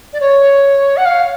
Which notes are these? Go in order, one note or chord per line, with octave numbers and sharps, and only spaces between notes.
D5
C#5
F#5
F5